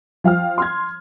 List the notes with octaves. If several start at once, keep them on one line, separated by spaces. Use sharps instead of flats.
F3 F5 G5 F6
C6 F6 G#6